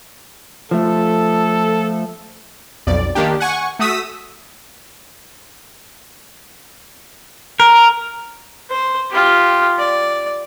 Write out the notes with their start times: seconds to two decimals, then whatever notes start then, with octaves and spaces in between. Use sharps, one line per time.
0.71 F3 A3 A4
2.87 B1 F2 D5
3.15 D#3 A#3 D4 G4
3.40 F#5 G#5 C#6
3.79 A3 F#4 D#6 E6 B6
7.60 A#4
8.70 C5
9.11 F4 G4
9.78 D5